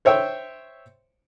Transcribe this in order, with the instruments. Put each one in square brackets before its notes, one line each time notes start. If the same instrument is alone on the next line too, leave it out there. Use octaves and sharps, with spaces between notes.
[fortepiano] C5 C#5 E5 G5